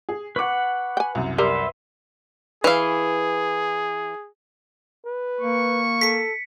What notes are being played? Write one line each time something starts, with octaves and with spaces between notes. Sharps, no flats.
G#4
B4 F#5 C#6 D6
G5 G#5
C2 F#2
G3 A#4 B4 E5 C6
E3 G#4 F5
B4
A#3 C#6
A4 B6 C#7